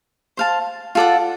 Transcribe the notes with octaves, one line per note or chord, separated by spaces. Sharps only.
C5 F5 A5
F4 A4 D5 F#5